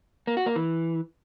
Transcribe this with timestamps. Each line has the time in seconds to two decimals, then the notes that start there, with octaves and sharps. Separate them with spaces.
0.27 A#3
0.37 F#4
0.46 A#3
0.56 E3